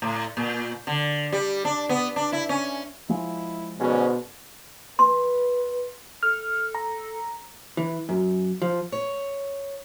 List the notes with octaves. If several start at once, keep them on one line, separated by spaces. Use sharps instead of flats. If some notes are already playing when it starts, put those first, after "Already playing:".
A2
A#2
D3
G3
D4
B3
D4
E4
C#4
F3 G#3 E4
G#2 B2 D3 C#4
B4 C6
A4 F6
A#5
E3
F#2
F3
C#5